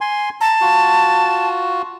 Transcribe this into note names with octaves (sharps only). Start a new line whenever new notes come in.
G#5 C6
A5 A#5
F4 F#4